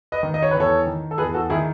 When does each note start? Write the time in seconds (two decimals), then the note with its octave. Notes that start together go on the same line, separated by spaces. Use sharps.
0.12 B4 D#5
0.23 D#3
0.34 D#5
0.43 C#5
0.51 E2 B4
0.60 A4 C#5
0.86 D#3
1.11 A4
1.18 E2 G#4 B4
1.34 F#4 A4
1.50 D#3 E4 G#4